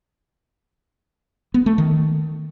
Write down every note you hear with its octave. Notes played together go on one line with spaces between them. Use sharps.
B3
A3
D#3